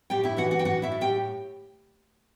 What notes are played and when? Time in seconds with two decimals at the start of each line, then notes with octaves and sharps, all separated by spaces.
0.10 A2 G4 G5
0.24 E4 E5
0.37 E3 F#4 F#5
0.51 F#4 F#5
0.59 G5
0.65 A2 F#4 F#5
0.82 E4 E5
0.92 A2
1.01 G4 G5